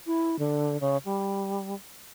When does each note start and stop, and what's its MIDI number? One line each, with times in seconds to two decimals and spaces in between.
0.06 0.39 64
0.39 0.79 50
0.81 0.97 49
1.05 1.75 55